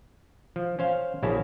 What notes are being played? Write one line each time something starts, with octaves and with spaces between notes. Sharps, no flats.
F3
C#4 C5 F5
A#1 C#3 C#4 E4 F#4 A5